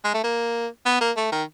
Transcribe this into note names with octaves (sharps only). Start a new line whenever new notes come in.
G#3
A3
A#3
B3
A#3
A3
D#3